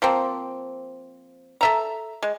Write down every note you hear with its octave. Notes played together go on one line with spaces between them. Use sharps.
F3 A#3 C4
A4 E5 A#5
G#3